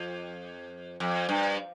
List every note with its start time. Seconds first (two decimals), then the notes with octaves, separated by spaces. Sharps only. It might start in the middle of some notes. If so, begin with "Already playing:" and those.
Already playing: F2
1.00 F2
1.29 G2